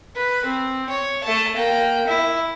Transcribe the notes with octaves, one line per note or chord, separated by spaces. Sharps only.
B4
C4
C#5
A3 A5
A#3 G5
E4